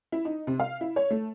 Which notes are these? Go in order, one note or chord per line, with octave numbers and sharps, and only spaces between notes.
E4
D#4
C3
F5
E4
C#5
A3